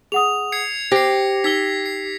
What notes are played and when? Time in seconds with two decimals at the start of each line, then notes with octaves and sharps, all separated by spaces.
0.12 G#4 F#5 D#6 F7
0.52 G#6 C7 C#7
0.92 G4 C5 A#6 C7
1.44 D#4 E6 G#6 B6 G7
1.86 C7